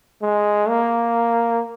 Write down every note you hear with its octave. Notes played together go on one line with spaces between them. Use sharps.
G#3
A#3